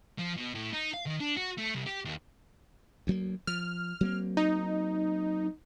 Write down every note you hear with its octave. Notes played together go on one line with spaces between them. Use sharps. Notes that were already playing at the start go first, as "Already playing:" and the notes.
F3
B2
A2
D#4
F5
D#3
D4
F#4
A3
C2
G4
D#2
D2 F#3 A#3
F3 F6
F#3 A#3 C4
D#4